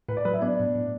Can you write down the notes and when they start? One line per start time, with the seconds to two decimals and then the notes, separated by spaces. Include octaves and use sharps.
0.09 A2 B4
0.17 D5
0.25 F#3 B4
0.34 E4
0.42 B3 D4
0.59 A2
0.75 A2